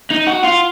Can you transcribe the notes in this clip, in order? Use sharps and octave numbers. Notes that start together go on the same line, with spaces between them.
D#4
F#4
F4